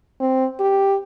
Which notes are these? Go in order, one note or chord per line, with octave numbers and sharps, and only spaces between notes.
C4
G4